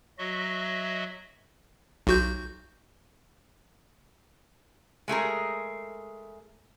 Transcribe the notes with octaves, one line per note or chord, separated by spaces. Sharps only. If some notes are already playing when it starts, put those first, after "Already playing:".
F#3 F#4 D#5 E5
B1 F#4 G6
G#3 A3 G#4 A#4